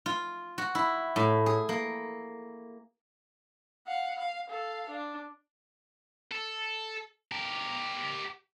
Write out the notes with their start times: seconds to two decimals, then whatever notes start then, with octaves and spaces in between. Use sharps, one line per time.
0.06 F4
0.58 F#4
0.75 E4
1.16 A2
1.46 G#4
1.69 A#3
3.87 F5 F#5
4.18 F5
4.50 A4 F5
4.89 D4
6.32 A4
7.32 G4 A#4